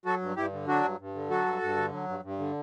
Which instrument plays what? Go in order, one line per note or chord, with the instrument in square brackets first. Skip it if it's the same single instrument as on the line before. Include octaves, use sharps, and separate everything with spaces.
[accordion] F#3 F#4 A4
G2
G2 E4 G4
D3
F#3 D4 F#4
G2
G2
D3
F#3 F#4 A4
G2
G2
D3
F#3
G2
G2
D3